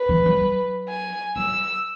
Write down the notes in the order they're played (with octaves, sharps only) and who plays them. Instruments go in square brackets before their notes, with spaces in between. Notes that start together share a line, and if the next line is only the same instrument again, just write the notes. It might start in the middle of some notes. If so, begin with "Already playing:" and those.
Already playing: [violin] B4
[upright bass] E3
F#3
F#3
[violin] G#5
[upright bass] F#3 [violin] E6